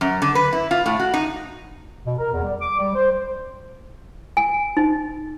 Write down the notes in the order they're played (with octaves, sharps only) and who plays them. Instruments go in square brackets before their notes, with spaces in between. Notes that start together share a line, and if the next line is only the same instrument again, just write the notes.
[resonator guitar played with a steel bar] F#2
D3
B4
E4
F4
A2
F#4
D#4
[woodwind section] B2
A#4
E2
G3
D6
G3
C5
[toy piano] G#5
D#4